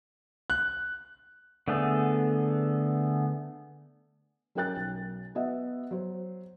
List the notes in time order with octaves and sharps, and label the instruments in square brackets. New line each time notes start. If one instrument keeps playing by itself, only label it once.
[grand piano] F#6
[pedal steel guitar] D3 A3 B3 G#4 A4
[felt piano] F#3 C#4 A#4 G5 F#6 A6
B1
B3 F#4 D#5 E5 F#5
F#3 C5